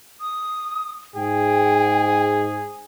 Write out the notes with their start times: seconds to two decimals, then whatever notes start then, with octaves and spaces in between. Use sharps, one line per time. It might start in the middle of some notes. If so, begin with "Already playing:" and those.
0.21 D#6
1.16 G#2 G#4 G5